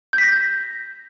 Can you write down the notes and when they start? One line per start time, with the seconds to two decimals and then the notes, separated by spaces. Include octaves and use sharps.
0.13 G6
0.18 B6
0.23 A#6